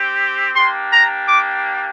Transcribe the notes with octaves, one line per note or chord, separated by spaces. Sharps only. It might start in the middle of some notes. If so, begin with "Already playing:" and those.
Already playing: C4 G4
A#3 D4 G4 C6
A#5
D6